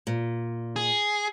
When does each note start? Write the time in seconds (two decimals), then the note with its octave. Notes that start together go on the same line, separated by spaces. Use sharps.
0.07 A#2
0.76 G#4